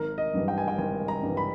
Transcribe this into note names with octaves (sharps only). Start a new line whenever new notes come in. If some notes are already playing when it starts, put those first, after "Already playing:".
Already playing: G#1 A#4
D#5
G2 E3 G3
G5
G#5
G5
G#1 G#5
A#5
G2 E3 G3
B5